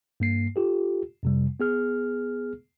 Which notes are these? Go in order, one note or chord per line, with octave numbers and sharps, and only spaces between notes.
G2 A#3 C7
F4 G4 A4
F2 C3 G3
B3 G#4 F6